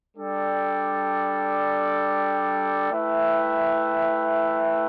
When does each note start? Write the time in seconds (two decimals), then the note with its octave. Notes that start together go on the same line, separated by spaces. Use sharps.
0.17 G3 D4 A4 D5 G5
2.91 A3 E4 B4 E5 G5